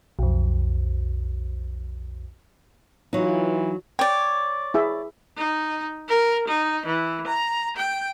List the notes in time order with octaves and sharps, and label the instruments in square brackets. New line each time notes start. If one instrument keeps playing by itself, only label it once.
[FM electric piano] B1 F2
[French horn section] E3 F4 [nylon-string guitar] F#3 D#4
[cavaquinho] C#5 D5 [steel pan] G5
[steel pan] E4 G#4 E5
[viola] D#4
A#4
D#4
E3
A#5
G5